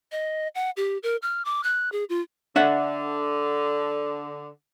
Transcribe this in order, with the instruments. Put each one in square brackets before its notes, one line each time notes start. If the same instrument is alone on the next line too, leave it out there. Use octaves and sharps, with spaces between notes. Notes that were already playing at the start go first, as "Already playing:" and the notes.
[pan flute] D#5
F#5
G4
A#4
F6
D6
F#6
G#4
F4
[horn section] D3 [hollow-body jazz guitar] D4 E5 F#5